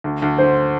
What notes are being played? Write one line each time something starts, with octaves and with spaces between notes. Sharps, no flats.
D2
D2
D3 C5